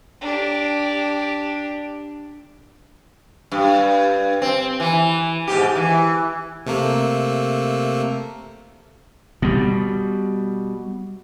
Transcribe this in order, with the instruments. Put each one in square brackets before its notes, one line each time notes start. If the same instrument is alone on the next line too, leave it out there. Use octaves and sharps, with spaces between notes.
[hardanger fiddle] D4 G4
[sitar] G2
C4
E3
G#2 B2 G4
E3
[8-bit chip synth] C3 A3 A#3
[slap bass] B2 G3